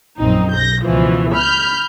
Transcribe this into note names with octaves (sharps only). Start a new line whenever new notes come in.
A#1 F#2 C4 D#4
B1 G6 A#6
C#2 B2 E3 F3
B5 F6 G6